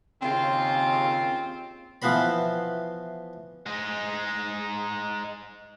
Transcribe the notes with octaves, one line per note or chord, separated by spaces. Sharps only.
D#2 C#3 C4 F4
E3 F3 B3 C5 B5
G#3 D#4